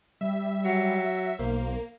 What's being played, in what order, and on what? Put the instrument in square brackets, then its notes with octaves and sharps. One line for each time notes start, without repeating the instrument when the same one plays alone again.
[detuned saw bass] G3 [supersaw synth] E5
[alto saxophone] F#3
[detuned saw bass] B1 [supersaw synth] A#3 [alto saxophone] C5